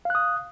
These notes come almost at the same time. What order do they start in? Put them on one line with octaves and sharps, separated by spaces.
F5 F#6 D#6